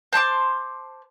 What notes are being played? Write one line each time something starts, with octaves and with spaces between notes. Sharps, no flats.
C5 A5 C6 D6